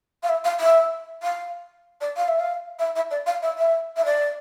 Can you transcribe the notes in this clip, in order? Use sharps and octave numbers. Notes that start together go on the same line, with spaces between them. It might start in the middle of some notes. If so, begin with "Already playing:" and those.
F5
E5
F5
E5
F5
D5
F5
E5
F5
E5
E5
D5
F5
E5
E5
E5
D5